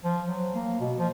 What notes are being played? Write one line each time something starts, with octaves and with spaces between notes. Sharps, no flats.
F3
F#3
A#3
B2
F3